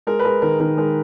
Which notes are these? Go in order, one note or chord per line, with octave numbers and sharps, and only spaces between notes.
G#3 A#4
B4
G#3 A#4
D#3 A#4
D#3 A#4
G#3 A#4